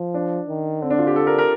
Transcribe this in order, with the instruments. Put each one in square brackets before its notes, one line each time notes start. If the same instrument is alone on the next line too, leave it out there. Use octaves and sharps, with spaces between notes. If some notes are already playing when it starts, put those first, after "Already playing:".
Already playing: [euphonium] F3
[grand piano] D4
[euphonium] D#3
[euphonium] D3 [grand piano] C4
[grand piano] D4
F4
G4
A4
A#4
A#4